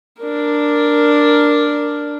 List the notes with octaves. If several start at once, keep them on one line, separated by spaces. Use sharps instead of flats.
D4 A#4